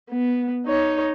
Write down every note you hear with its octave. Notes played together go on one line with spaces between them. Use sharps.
B3
D#4 C#5